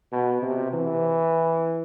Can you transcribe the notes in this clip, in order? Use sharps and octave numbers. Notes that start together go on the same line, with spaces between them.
B2
C3
E3